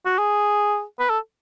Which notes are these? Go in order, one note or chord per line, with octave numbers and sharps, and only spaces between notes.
F#4
G#4
B4
A4